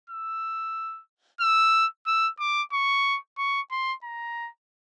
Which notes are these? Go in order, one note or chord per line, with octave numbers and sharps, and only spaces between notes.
E6
E6
E6
D6
C#6
C#6
C6
A#5